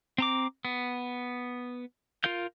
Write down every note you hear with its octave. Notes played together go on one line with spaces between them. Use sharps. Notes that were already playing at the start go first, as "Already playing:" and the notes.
C4 A#5 D6
B3
F4 A#4 F5 G6